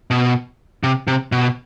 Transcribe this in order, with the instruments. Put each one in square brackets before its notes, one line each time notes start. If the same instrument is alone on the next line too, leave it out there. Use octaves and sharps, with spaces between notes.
[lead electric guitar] B2
C3
C3
B2